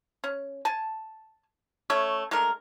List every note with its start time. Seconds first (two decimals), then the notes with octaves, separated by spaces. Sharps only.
0.24 C#4
0.65 G#5 A5
1.90 A3 C#4 C#5 E5
2.31 G#3 A3 D4 A#4